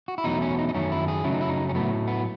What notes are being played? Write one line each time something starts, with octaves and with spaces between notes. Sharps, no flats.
F#4
E4
E2 B2 F#3 A3 D#4
C#4
D#4
D#4
F#2 D#3 F#3 A3 C#4
E4
G#4
F#2 C#3 F#3 A3 E4
D#4
E4
D#4
C#4
A2 F#3 A3 B3
B3